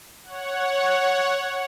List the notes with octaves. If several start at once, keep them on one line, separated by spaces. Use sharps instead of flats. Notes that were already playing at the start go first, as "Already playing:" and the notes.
C#5 F#5